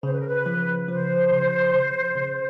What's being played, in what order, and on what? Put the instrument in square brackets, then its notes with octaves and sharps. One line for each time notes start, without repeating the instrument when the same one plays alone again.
[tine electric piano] C#3 [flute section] C5
[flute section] B4
A#4
B4
[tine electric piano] F3
[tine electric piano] F3 [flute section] C5
[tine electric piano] C#3
C#3
C#3